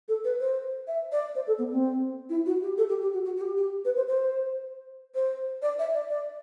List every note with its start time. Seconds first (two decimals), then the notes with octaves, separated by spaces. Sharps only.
0.08 A4
0.24 B4
0.40 C5
0.87 E5
1.12 D5
1.35 C5
1.47 A4
1.59 B3
1.71 C4
2.29 E4
2.46 F#4
2.62 G4
2.78 A4
2.89 G4
3.02 G4
3.13 F#4
3.25 F#4
3.37 F#4
3.41 G4
3.57 G4
3.85 B4
3.97 C5
4.08 C5
5.15 C5
5.62 D5
5.79 E5
5.94 D5
6.10 D5